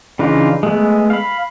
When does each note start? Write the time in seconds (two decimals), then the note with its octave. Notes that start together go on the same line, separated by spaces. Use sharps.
0.19 C#3 E3 D4 D#4 F4
0.63 G#3 A3 B3
1.10 F5 B5